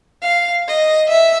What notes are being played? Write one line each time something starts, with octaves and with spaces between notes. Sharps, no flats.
F5
D#5
E5